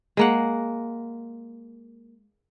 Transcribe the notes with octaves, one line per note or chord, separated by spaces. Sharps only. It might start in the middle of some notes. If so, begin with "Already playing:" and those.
G#3 A#3 F#5